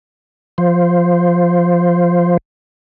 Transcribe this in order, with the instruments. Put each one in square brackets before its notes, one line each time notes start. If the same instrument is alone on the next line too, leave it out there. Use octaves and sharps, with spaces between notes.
[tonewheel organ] F3 C5